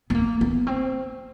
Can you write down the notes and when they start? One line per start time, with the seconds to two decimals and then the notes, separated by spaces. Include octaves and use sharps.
0.10 B3
0.15 A#3
0.41 B3
0.67 C4